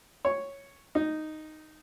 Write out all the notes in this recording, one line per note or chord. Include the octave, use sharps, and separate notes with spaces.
C#5
D#4